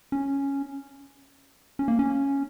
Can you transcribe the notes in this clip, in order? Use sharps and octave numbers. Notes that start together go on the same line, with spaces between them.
C#4
C#4
A#3
C#4